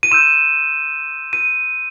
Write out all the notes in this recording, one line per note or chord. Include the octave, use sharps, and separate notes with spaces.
D#7
C6 E6 G6 E7
D#7